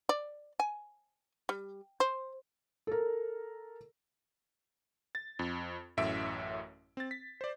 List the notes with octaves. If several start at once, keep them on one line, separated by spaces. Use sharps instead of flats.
D5
G#5
G3
C5
A4 A#4
A6
F2
A1 F#2 A2 E5 D7
C4 A6
B6
C5 D5